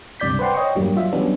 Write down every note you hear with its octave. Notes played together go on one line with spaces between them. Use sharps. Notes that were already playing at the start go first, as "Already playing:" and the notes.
C#2 G2 C3 D5 G6 B6
B4 C5 D5 F#5 G5 C6
C#5 D#5 G5 C#6
E2 G2 F#3 G3 A#3
F#3 F4 E5
E3 F#3 G3 B3 C#4 D4